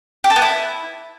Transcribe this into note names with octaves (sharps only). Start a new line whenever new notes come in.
G4
A4
B3
E4